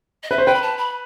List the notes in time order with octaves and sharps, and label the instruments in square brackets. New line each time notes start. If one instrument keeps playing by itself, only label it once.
[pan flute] D#5
[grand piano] B4 [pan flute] E5
[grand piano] C5
[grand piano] B4 [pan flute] G5
[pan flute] B5
A5
B5